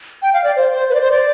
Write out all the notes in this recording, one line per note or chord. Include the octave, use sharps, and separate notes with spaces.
G5
F5
D5
C5
C5
B4
D5
C5
D5